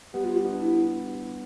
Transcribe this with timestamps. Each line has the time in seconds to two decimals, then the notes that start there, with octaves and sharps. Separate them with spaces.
0.14 G3 B3 G4
0.25 F4
0.36 G4
0.45 B3 D4
0.61 E4